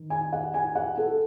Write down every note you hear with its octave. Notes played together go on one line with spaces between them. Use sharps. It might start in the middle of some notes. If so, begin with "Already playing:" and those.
Already playing: D#3
G#5
F#5
G#5
F#5
A4